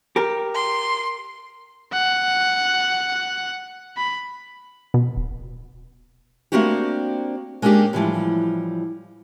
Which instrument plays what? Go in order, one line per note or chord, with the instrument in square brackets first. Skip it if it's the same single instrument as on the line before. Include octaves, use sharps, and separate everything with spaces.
[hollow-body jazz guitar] G4 A#4
[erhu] C6
[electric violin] F#5
B5
[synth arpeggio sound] B2
[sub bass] D1
[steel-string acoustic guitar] A3 A#3 C4 D4 F#4 G4
G#3 A#3 C#4 D4 G4
A2 E3 F3 G3